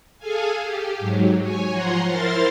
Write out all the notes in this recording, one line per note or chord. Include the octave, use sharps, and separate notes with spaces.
G#4 A4 F5 G#5
G4
G#2 F#3
C#5 G#5
F3 F#5 A#5 C6
E4 A#4 C5 C6 F6 A6